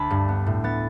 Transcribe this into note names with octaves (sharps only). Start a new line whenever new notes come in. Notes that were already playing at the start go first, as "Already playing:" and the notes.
Already playing: D2 A5 B5
G2
B3
A2
B3 A6